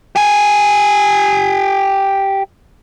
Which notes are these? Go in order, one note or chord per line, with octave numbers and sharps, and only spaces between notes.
G4 G#5